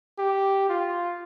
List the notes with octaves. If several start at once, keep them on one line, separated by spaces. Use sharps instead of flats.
G4
F4